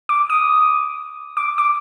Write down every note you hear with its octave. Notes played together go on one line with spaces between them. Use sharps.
D6
D#6
D6
D6